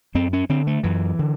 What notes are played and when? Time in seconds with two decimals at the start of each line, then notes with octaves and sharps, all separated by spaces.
0.15 F#2 C4
0.33 C#4
0.49 D3 C4
0.67 A3
0.83 F#2 E3
1.19 D3